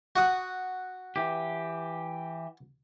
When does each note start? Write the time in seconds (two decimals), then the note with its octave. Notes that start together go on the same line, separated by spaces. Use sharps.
0.16 F#4 F#5 D#6
1.16 E3 G4